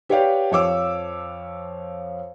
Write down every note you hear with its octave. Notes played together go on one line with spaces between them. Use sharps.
G4 B4 C#5 D5 F5 G5
F2 F3 C#5 F5 D6 E6